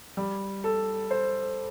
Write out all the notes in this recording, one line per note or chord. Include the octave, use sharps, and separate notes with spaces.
G3
A4
C5